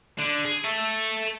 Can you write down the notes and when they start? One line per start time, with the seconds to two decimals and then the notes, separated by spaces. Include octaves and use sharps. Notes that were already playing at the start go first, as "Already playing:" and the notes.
0.19 D3
0.45 G#4
0.64 A4 E5